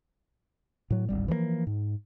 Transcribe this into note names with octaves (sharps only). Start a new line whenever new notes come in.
A2 F#3
D1 G#1 G3
E3 F3 G#3 A#3
G#2